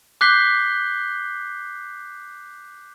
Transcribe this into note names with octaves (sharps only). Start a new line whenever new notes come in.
D6 F#6 G6 B6 C7 G7